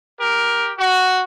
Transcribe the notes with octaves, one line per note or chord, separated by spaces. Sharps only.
G4 A#4
F#4